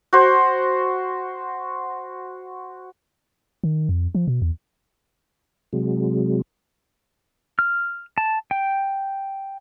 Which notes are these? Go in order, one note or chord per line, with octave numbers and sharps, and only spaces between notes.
F#4 C5
D#3
F2
F3
B2
E2
C3 F#3 G#3
F6
A5
G5